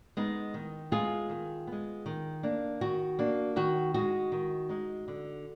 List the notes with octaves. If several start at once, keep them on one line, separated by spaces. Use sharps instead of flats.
G#3 B3 D#4
D#3
G#3 B3 F4 G#4
D#3
G#3 B3
D#3
A#3 D4
D#3 F#4
A#3 D4
D#3 F#4
G#3 D#4 F#4
D#3
G#3 D#4
D3